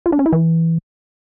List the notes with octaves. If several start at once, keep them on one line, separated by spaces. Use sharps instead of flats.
F4
D4
C#4
E4
E3